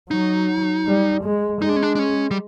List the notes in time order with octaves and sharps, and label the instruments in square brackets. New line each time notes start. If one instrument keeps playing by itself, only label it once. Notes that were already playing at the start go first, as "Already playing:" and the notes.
[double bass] F#3 [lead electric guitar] D#4
[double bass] G3
G#3
[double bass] G#3 [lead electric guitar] D#4
[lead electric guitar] D4
C#4
D4
D4
C#4
G3